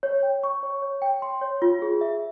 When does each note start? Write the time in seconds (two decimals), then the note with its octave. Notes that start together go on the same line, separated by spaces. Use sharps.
0.03 C#5
0.23 G5
0.43 C#6
0.63 C#5
0.82 C#5
1.02 G5
1.22 C6
1.41 C#5
1.62 F4
1.82 G#4
2.01 E5